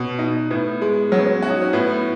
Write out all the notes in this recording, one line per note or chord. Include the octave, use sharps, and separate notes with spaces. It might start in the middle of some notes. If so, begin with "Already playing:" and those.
Already playing: B2 C#4
D#4
A2 B3
G#3
F#3 C#4
B3
C#4
F#4
D#4
C#4
A2 B3